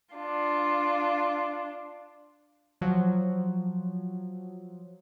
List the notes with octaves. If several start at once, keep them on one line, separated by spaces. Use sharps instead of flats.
D4 F4
F3 F#3